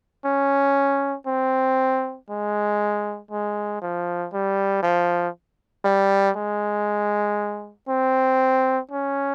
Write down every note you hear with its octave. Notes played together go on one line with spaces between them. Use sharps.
C#4
C4
G#3
G#3
F3
G3
F3
G3
G#3
C4
C#4